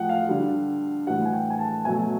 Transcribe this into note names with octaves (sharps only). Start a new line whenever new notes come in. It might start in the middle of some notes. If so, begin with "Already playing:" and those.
Already playing: A2 F3 A3 F#5 G5
F5
D3 G3
A2 E3 G3 F#5
G#5
G5
G#5
A5
B2 F#3 A3 G#5